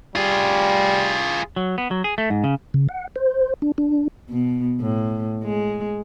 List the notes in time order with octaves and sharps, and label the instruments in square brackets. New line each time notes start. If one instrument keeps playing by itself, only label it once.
[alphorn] G3 [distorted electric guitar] F4 G#4
[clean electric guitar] F#3
B3
F#3
G#4
A3
G#2
C#3
[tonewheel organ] C#3
F#5
C5
D4
D4
[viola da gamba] B2
A2
G#3